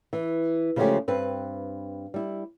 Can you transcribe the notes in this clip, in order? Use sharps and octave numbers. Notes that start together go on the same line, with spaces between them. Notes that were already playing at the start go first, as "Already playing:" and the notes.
E3
C#3 F3 G#3 A3 C#4 G4
G2 C4 B4
G3 E4